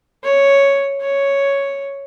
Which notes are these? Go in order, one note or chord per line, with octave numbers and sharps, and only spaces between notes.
C#5
C#5